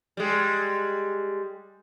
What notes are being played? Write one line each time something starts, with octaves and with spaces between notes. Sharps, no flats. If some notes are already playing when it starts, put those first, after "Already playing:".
G3 G#3